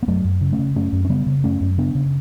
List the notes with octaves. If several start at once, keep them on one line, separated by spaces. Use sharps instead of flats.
B3
F#2 F#3 A3
F#2
C#3
A3 C#4
C#3
F#2 A3 C#4
F#2
C#4
C#3 G3 B3
C#3
F#2 A3 C#4
F#2
C#3 B3 D4
C#3